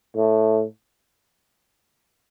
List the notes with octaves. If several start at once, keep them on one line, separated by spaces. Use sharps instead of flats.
A2